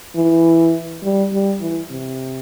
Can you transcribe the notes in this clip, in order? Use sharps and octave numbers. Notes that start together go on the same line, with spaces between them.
E3
G3
G3
E3
C3